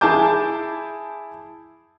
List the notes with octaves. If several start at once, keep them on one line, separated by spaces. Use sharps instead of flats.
E4 G#4 G#5 A5 D6 G6